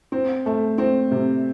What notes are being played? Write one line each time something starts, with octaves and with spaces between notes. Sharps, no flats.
C4
A3
C4
C3